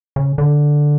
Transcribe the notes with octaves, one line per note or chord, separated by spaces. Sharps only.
C#3
D3